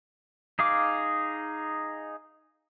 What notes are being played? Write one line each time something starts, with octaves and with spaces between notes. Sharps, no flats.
D#4 G#4 F5 D6